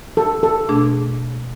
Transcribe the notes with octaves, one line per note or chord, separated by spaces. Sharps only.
A4
A4
B2 A3 D4 G#4